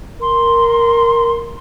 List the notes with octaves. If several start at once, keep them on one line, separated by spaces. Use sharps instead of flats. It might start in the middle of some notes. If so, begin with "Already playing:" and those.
A#4 C6